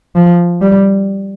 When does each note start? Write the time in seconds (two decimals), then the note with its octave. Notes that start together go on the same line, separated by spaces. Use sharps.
0.16 F3
0.62 G3